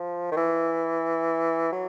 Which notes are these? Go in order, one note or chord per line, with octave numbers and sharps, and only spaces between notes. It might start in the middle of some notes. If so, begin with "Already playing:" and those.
Already playing: F3
D#3
E3
F#3